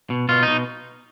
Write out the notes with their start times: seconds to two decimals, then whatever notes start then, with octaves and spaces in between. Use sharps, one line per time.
0.10 B2
0.29 B2 F4
0.43 D#4
0.48 B2